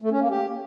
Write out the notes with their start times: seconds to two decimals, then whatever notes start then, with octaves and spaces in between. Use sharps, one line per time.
0.02 A3
0.11 C#4
0.21 A#3
0.31 G4